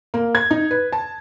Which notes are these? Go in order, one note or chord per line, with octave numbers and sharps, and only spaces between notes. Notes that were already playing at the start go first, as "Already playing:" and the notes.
A#3
G#6
D#4
B4
A5